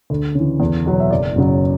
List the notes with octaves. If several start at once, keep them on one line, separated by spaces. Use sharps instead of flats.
D2
C#3 E3
E2
B2 F#3
E5
F#1 D5
F#2 C#3 F#3